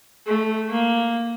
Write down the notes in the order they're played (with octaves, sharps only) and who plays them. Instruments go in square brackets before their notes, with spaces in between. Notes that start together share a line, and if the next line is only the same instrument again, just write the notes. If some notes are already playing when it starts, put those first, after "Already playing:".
[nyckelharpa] A3
A#3